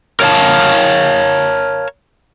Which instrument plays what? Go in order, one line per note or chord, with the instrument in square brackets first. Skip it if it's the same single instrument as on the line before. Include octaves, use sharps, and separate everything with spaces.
[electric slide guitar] A#4 C#5 F5 A5